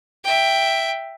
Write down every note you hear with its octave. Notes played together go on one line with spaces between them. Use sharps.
E5 G5